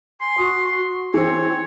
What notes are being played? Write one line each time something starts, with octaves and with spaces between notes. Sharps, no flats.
G#5 C6
F#4 D#6
E3 C4 C#5